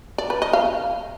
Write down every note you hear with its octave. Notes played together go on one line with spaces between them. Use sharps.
D5
B4
D#5
F5